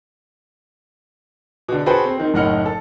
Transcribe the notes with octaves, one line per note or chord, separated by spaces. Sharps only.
B2 D3
F#4 G#4 A4 B4 C5 G5
C4
D#3 C4
F#1 A2 D#4 F#5 F6 C#7
A4